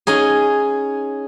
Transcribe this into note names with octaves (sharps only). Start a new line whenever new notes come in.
C#4 D#4 G#4